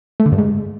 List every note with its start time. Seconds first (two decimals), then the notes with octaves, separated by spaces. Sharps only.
0.20 A3
0.26 D3
0.32 G2
0.38 G#2